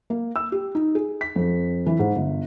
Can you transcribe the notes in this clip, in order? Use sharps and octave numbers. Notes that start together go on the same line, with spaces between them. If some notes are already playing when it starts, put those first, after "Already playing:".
A#3
E6
G4
D#4
G#4
B6
F2
E3
G#2
G1